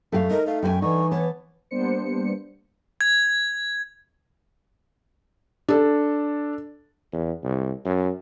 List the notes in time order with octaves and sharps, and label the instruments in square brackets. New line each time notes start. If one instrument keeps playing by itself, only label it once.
[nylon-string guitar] F#2 G4 F5 [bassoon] A3
[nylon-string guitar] D#4 [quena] A#4
[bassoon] A3 [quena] F5
[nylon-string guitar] F#2 F#4 G#5 [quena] G5
[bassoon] D3 [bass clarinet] E3 [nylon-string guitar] D#4 [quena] C#6
[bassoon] B3 [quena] C#5 [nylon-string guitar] A5
[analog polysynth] G3 A#3 B3 D4 C5 C#7
[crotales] G#6
[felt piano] D4 A4
[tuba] E2
C2
F#2